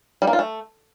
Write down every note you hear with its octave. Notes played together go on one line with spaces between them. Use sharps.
G3
A#3
F4
A3